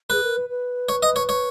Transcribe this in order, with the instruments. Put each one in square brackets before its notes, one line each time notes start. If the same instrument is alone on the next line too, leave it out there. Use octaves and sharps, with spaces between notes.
[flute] G#4 [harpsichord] B4
[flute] A#4
B4
B4
[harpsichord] C#5
D#5
C#5
C#5